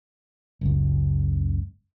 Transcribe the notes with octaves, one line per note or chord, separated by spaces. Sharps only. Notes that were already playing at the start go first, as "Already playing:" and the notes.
F#1 C#2